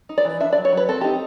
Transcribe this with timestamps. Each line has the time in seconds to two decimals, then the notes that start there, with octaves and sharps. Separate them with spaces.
0.09 D#4
0.18 D5
0.25 E3
0.41 D4 E5
0.53 D5
0.57 F#3
0.65 C#5
0.72 F#3 B4
0.89 C4 A4
1.01 D#4 G4